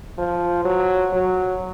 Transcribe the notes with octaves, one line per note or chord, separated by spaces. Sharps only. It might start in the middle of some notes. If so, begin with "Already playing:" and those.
F3
F#3
F#3